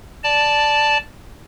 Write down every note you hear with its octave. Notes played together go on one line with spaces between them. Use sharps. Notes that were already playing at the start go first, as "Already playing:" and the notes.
D5 A5